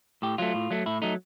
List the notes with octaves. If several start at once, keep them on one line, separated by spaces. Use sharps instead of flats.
A2 G4
F#3 A3 F4
A2
F#3 A3
A2 E4
F#3 A3 D#4